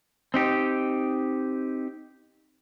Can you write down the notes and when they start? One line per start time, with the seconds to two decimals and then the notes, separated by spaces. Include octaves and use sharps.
0.34 C4 D#4 G4